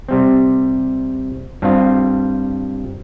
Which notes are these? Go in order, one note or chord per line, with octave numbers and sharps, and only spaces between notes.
C3 G3 C4
G2 G3 C4 F4